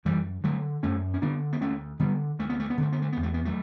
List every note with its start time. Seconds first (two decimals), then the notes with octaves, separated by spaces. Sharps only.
0.05 F#2 E3 G3
0.44 D3 F#3 A3
0.83 F#2 A3 C#4
1.14 C#4
1.22 D3 B3 D4
1.53 B3
1.60 D2 A3 C#4
1.99 D3 G3 B3
2.39 D2 A3
2.50 B3
2.60 A3
2.70 B3
2.78 D3 A3
2.92 B3
3.02 A3
3.12 E2 B3
3.23 A3
3.34 B3
3.45 F#3 A3